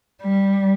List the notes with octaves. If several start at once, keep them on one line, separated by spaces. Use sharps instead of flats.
G3